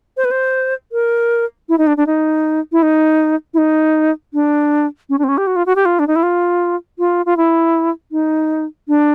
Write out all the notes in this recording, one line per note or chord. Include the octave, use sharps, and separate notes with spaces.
C5
B4
C5
A#4
E4
D#4
D4
D4
D#4
E4
D#4
E4
D#4
D4
C#4
D4
C4
C#4
G4
F#4
F4
F#4
G4
F4
D4
D#4
E4
F4
F4
F4
E4
D#4
D4